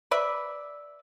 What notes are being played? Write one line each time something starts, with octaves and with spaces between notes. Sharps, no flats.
B4 D5 E5